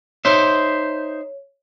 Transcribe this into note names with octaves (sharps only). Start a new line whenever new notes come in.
D#4 C5 C#5 E5